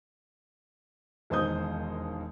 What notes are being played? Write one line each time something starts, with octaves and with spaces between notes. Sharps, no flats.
E1 D#2 C5 D#5 D#6 G6